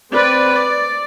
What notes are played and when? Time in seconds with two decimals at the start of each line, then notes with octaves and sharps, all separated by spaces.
0.12 C4 B4 D5
0.54 D5